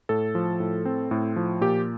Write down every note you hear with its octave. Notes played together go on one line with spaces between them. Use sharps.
A2 A4
F3
A2
C4
A2
F3
A#2 G4